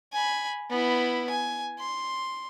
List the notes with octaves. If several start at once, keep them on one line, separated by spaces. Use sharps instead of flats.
G#5 B5
B3 E4
G#5
C6